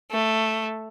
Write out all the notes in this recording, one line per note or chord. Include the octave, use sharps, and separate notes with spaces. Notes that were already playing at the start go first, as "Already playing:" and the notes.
A3